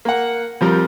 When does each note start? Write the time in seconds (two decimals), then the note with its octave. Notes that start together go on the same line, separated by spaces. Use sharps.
0.05 A#3 F#5
0.61 F2 F3 G3 A#4